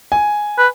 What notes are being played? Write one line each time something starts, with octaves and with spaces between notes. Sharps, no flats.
G#5
B4